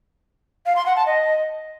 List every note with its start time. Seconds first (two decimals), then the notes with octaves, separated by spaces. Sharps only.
0.66 F5
0.76 C6
0.86 F#5
0.96 A5
1.06 D#5